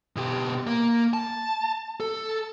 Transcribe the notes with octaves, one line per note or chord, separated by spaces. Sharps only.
B2 G4
A#3
A5
A4